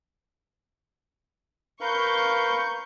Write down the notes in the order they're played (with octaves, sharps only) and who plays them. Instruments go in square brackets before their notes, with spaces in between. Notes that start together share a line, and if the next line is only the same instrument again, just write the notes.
[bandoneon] A#4 B4 F5 [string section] C#6 G6